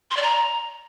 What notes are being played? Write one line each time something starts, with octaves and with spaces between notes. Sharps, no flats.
C6
D5
A#5